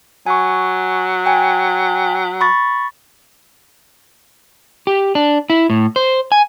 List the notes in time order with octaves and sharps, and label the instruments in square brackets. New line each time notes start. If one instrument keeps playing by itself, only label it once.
[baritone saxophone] F#3 [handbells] G#5 C#6
[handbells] G5 G#5
B5 C#6 A6
[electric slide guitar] G4
D4
E4
A2
C5
G#5